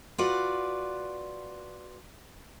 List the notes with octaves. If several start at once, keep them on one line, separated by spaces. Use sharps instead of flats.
F4 F#4 B4 D5